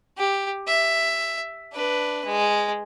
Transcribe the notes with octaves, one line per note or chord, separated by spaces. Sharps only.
G4
E5
D4 B4
G#3